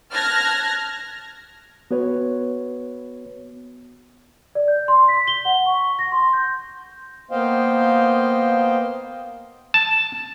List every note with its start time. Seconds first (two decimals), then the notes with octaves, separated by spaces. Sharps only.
0.12 A5 F6 F#6 G#6 A#6
1.91 B3 F#4 B4 C#5
4.55 D5
4.68 G6
4.88 C6
5.08 B6
5.27 G7
5.45 F#5
5.66 C#6
5.99 A#6
6.12 C6
6.33 G6
7.31 A#3 B3 C5 D#5 F5 G5
9.74 A5